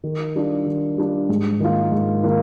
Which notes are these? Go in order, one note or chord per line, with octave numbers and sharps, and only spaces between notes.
D#3
G3 D4 F4
D#3
G3 D4 F4
G#2
D#3 A#3 F4
G#2
D#3 A#3 F4